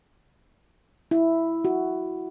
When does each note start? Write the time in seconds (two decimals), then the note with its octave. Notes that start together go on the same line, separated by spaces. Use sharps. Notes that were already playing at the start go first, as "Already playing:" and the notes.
1.11 E4
1.65 F#4